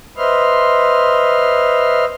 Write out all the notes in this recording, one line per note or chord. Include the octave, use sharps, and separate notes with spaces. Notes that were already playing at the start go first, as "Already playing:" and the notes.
B4 C5 D#5 E5 C6 F6